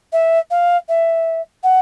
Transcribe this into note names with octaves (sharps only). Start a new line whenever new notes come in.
E5
F5
E5
F#5